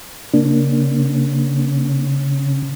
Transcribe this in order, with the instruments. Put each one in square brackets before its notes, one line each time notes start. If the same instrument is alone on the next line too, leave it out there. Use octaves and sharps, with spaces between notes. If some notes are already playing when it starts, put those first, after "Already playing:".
[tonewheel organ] C#3 [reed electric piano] A#3 D4